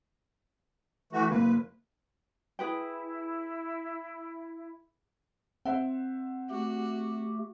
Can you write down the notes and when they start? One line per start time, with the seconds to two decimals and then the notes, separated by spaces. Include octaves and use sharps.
1.13 E3 A3 F#4
1.31 F#1 A#3 B4
2.59 E4 G#4 B4 G5
5.65 C4 C5 E5 F#5
6.50 A3 F#4 G4